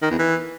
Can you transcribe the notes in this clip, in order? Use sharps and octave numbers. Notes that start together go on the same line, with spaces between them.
D#3
E2
E3